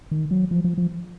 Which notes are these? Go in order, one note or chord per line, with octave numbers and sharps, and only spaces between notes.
D#3
F#3
F3
F3
F3